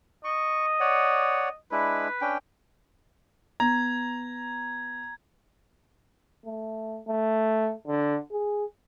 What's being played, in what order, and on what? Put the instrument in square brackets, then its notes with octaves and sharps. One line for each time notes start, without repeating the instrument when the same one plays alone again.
[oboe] D#5 [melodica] C#6
[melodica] C#5 D5 F#5
[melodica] G#3 D4 E4 [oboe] B4
[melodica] C#4 D4 G5
[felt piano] B3 [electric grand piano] A#5 [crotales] G#6
[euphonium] A3
A3
D3
G#4